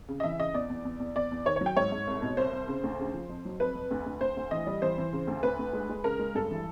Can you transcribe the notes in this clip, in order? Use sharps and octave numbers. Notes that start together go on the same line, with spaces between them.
C#3
D#5
E3 E5
C#3 D#5
E2 D5
E2
E2
E2
E2 D5
E2
D#3 C#5
F#3 C#5
G5
G#2 C#5
G#2
C2
B2
C2 C5
C2
C#3
D2
C#3
F3
F2
F#3
F2 B4
F2
D2
D2
D2 C5
D2
E3 D#5
G3
E3 C5
E3
C#3
D2
D2 B4
D2
G#3
G#3
C#3 A#4
G#3
G2 A4
E3